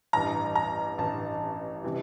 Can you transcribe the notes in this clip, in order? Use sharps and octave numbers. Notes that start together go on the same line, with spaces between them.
A1 G2 E3 A#5
A#5
A1 G2 E3 A5
C3 E3 G3